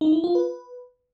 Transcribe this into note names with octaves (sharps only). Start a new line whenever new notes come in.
D#4
E4
F4
B4